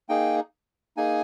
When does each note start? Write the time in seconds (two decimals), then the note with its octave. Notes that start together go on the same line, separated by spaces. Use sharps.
0.09 A#3 D#4 G#4 G5
0.97 A#3 D#4 G#4 G#5